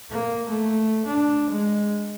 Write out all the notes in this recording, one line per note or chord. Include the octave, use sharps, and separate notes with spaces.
A#3
A3
D4
G#3